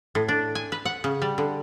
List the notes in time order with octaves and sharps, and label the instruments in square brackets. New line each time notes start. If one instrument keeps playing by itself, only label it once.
[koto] A2
D4
G#5
B4
F#5
C#3
G3
D3